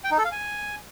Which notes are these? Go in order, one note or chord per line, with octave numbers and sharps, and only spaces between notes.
G5
D#4
A4
F5
G#5